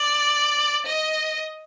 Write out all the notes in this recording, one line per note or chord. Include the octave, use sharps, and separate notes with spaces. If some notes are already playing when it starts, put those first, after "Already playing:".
Already playing: D5
D#5